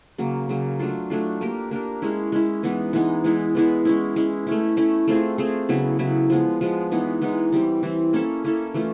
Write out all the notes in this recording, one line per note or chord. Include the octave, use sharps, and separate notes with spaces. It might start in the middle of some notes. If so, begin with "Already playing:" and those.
C#3 F#3 A#3
C#3 F#3 A#3
F#3 A3 D4 F4
F#3 A3 D4 F4
A#3 D4 G4 A#4
A#3 D4 G4 A#4
G#3 C#4 E4
G#3 C#4 E4
E3 G#3 B3 D#4
E3 G#3 B3 D#4
E3 G#3 B3 E4
E3 G#3 B3 E4
G#3 C#4 E4
G#3 C#4 E4
A3 C#4 E4
A3 C#4 E4
A3 C4 F4 G#4
A3 C4 F4 G#4
C#3 F#3 B3 E4
C#3 F#3 B3 E4
F3 G#3 B3
F3 G#3 B3
E3 G#3 B3 D#4
E3 G#3 B3 D#4
E3 G3 C4
E3 G3 C4
A#3 C#4 E4 A4
A#3 C#4 E4 A4
E3 A3 C#4 F4